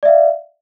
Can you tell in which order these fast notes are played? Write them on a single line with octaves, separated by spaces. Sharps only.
D5 E5 F5